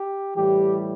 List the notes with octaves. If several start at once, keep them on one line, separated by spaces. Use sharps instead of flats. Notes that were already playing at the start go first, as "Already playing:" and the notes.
Already playing: G4
A2 E3 G3 G4